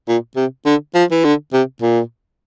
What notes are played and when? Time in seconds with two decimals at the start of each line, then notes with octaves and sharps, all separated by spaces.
0.08 A#2
0.36 C3
0.66 D3
0.95 F3
1.11 E3
1.24 D3
1.53 C3
1.82 A#2